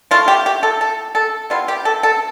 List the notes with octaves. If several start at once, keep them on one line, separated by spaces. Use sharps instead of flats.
F3 A3 E4 F4
G4
G4
A4
A4
A4
G3 B3 E4 F4
G4
A4
A4